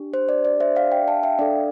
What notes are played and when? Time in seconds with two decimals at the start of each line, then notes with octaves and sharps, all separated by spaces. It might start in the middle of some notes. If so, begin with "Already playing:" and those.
Already playing: D4 G4
0.14 C5
0.29 D5
0.45 D5
0.60 C5 E5
0.76 D5 F5
0.92 E5 G5
1.08 F5 A5
1.23 E5 G5
1.39 D4 A4 D5 F5